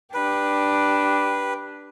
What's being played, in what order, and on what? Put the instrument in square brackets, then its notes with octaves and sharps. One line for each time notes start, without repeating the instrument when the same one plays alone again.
[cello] D4 [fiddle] G4 [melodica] B4